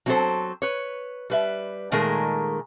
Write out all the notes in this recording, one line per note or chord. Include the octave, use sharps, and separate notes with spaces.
F#3 C4 E4 F#4 A4 C5
B4 C#5
G3 B4 E5
A#2 D#3 G#3 A3 G#4 A#4